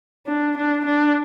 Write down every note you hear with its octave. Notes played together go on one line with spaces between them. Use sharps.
D4
D4
D4